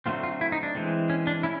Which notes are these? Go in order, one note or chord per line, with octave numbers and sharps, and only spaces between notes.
D3 F#3 A3 C4 F4
F4
E4
D#4
D4
E3 G#3 C4
C#4
D4
C#4 E4